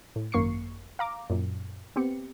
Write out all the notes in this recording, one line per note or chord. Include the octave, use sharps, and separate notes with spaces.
A2
G#1 F#2 A#3 C#6 C7 C#7
F5 A#5 D6
F#2 A#2
B3 C4 G4 C#7